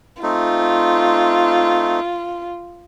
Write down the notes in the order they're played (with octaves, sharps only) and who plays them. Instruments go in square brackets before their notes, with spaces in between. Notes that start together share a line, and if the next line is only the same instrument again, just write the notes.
[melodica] A3 C4 D#4 [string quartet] F4